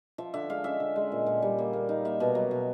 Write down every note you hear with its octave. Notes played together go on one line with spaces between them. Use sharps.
F3 E5
D3 E5
G#3 F5
C#4 E5
D3
G#3
A#2
A#2
G3
A#3
A#3
D#4
A#3 E5
B2
F#3
B2